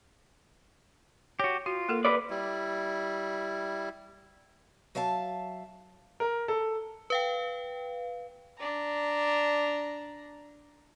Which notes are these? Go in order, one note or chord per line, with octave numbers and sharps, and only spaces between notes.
F#4 G4 C#5
F4 F#4
A#3 A4 A#4
B4 D5
G3 E4
F#3 E5 F5 A5
A#4
A4
B4 F5 G5
D4 A#5